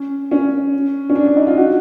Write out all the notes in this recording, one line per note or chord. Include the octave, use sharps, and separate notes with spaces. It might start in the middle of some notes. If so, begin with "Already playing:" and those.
Already playing: C#4
C#4
C#4
D4
D4
D#4
F4
F#4